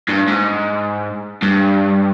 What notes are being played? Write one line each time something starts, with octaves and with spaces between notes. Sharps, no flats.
G2
G#2
G2